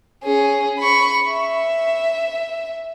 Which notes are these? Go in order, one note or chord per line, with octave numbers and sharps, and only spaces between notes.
C#4 G#4
B5 C#6
E5